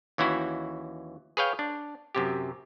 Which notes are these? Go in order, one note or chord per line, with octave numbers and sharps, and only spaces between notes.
D#2 E3 C#4 E4 F#4
G#4 B4 C#5 F5 G5
D4
F#2 C3 G4